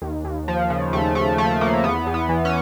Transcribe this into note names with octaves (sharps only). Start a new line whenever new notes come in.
D#2
D#2
F3
C#3
D#2 A3
D#2 A3
F3 A3
C#3 A#3
E2 B3
E2
B3
E3
C#4